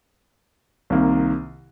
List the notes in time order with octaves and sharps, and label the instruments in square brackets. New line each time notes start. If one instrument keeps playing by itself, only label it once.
[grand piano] C2 C3 D#3 A#3